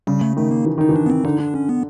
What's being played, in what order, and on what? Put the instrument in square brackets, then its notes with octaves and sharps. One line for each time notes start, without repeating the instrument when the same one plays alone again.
[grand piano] C#3 [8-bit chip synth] G3
[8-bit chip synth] A3
[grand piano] D#3 [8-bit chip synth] A3
[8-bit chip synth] A#3
[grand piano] E3
[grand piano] D#3 [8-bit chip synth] D#4
[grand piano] E3
[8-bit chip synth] D4
B3
C4
[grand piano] D3 [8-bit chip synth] D#4
[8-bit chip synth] D4
C#4
B3